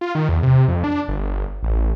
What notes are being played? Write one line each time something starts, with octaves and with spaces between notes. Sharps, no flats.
F4
D#3
E2
C3
F2
D4
G1
A1